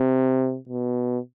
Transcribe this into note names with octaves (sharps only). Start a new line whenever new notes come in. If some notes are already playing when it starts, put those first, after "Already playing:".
Already playing: C3
B2